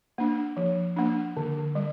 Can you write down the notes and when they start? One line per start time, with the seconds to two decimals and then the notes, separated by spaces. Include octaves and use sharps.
0.18 A#3 D4
0.57 F3
0.96 A#3 D4
1.37 D3
1.75 G3